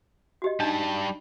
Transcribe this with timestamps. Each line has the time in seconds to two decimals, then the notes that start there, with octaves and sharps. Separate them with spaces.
0.42 F#4 G4 D#5
0.60 G3 D4 D#4 A5